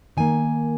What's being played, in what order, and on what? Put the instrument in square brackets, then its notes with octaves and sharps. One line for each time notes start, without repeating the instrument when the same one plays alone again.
[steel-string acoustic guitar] D#3 A#3 G#5